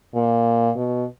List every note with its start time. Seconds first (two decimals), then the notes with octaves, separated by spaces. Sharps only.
0.14 A#2
0.76 B2